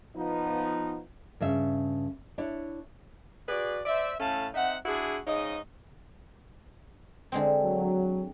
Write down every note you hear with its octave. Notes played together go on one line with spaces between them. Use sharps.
F3 B3 D#4
G2 C#3 E5
D4 E4 C#5
F#4 G#4 B4 D5
C5 D5 E5
A2 A3 C#4 F5 A5
C4 D#4 E5 F#5
D4 E4 F#4 G#4
G#2 C#3 D#4 D#5
D3 G#3 C4
F#3